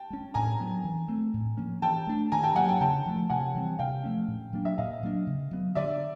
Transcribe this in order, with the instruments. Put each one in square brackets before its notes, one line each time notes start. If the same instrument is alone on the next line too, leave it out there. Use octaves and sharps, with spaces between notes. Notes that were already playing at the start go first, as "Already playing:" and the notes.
Already playing: [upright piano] G5 A5
[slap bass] G#3 C#4
[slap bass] A2 [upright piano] G#5 A#5
[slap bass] F#3 B3
E3
A3 C4
A2
F3 A#3 C#4
[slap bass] E3 [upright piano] G5 A5
[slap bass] A3 D4
[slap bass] D#3 [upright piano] G#5 A#5
[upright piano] G5 A5
[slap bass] F#3 A#3 [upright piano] F#5 G#5
[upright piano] G5 A5
[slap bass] C#3 [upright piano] G5 A5
[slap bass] F3 A3
[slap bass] C3 [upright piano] F#5 G#5
[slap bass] E3 G3 C4
[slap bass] C3 [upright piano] F5 G5
[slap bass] F3 A3 C#4
A#2
F#3 A#3 D4
[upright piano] E5
[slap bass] A#2 [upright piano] D#5 F5
[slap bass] F#3 A#3 D4
C#3
F#3 B3
[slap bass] D3 [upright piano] D5 E5